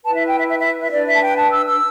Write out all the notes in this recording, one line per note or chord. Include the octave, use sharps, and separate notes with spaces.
E4 B4 A5
E5
G5
E5
E5
E5
E5
D4 B4 D5
E5
A5
G5
A5
E6
E6